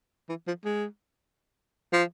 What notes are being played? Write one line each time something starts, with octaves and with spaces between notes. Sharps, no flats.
E3
F3
G#3
F3